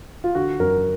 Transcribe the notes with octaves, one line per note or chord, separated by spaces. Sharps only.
F4
D3 F#4
F#2 A#4